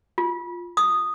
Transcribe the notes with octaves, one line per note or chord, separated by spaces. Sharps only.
F4
D#6